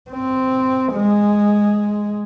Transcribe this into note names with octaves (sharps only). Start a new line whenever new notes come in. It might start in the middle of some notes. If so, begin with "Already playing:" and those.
C4
G#3